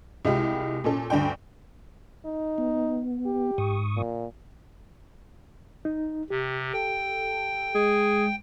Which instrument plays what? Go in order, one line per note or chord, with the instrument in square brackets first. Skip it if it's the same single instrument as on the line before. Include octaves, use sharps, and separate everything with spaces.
[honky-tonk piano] C2 G#3 E4 F4 G4
A#2 C#4 A4
D2 G2 D4 G5
[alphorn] D#4
[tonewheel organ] B3
[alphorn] G4
[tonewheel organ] G#2 C#6 D#6
[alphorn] A#2
[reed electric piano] D#4
[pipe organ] C3 [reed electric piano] G4
[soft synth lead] A4 [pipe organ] G5
[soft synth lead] G#3 [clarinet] G#4